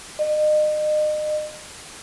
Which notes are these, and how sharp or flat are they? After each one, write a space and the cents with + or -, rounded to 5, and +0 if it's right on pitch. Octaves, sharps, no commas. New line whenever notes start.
D#5 -35